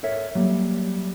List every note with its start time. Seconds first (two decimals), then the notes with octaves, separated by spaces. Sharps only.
0.03 A4 A#4 C#5 E5
0.35 F#3 G3 A#3